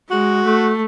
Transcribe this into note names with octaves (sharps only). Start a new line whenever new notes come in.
G#3 F#4
A3